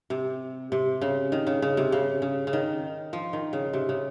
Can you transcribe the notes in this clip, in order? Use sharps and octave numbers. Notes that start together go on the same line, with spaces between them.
C3
C3
C#3
D#3
C#3
C#3
C3
C#3
C#3
C#3
D#3
F3
D#3
C#3
C3
C#3